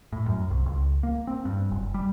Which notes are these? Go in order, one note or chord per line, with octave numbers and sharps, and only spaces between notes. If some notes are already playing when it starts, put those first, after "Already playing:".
A2
F#2
C2
C#2
A#3
C4
G2
F#1
G3